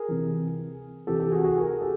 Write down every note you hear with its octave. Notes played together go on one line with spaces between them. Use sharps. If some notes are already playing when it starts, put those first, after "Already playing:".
Already playing: G#4 A#4
C3 E3
C3 E3 G4 A4
G4 A4
F#4 G#4
F#4 G#4
G#4 A#4
G4 A4